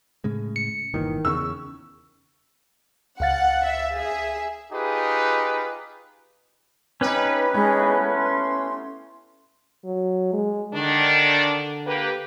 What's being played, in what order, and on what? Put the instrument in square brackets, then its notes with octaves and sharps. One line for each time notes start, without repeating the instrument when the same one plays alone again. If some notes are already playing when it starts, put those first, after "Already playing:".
[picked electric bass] A2 C#3 G#3
[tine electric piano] C#7
[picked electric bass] G1 A#2 E3 [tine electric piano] D#3
[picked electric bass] E2 C#3 [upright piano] C#6 E6
[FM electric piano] C#2 F5 A6 [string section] F#5
[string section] E5
G#4 E5
[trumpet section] D#4 F4 G4 G#4 B4
[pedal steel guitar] C#4 D#4 [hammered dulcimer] G4 [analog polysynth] B4
[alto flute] G#3 [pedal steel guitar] C#4 [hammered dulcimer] D#4 A5 A#5
[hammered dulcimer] A3 B3 E4
[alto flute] C6
[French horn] F#3
G#3
[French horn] D3 [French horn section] D#3 D4
[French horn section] A#3 G4 B4